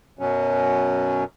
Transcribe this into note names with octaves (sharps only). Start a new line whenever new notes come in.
F#2 B2 F#3 C#4